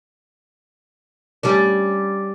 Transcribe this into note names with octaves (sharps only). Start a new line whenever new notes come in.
G3 C#4 D4